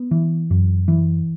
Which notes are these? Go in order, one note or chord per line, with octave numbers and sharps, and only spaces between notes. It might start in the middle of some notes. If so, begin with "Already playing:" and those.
Already playing: B3
E3
F#2
E3